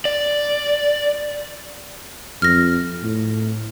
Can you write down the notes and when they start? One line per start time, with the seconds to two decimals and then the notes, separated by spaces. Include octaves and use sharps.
0.05 D5
2.42 F2 F6 A#6
3.03 A2